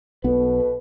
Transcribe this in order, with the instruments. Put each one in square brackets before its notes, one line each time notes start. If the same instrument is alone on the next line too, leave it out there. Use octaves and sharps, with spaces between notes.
[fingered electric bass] B1 B3 [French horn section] B2 A4 B4